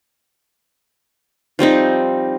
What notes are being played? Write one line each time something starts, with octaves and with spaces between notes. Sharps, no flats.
F3 G3 C4 D#4